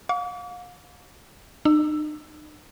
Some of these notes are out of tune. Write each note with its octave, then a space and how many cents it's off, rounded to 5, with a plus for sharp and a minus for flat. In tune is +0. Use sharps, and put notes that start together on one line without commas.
F5 +40 D6 -45
D#4 -40 E6 +15